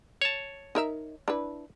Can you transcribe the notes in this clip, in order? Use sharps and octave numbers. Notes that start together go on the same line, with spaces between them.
C#5 A5
D#4 A#4 E5
D4 E4 B4